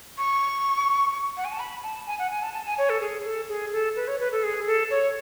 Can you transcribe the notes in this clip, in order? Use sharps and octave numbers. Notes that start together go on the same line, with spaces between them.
C#6
F#5
G#5
A5
B5
A5
G#5
F#5
G#5
A5
A5
G#5
C#5
A4
G#4
A4
G#4
A4
B4
C#5
B4
A4
G#4
A4
C#5